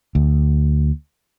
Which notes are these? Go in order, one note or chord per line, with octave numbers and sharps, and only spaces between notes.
D2